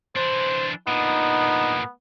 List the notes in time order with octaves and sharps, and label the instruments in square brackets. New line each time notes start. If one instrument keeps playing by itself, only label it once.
[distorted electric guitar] E3 D4 [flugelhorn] C5
[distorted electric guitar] A#2 D3 [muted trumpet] B3 [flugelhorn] D#4